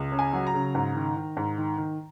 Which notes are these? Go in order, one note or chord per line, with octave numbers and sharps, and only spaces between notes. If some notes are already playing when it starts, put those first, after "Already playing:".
Already playing: C#2
C#3
G#5
F#3
A#5
C#3
G#2
D#3
D#3
G#2
D#3
D#3